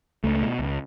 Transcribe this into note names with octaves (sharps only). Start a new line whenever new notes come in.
C#2 A3
B2
C#2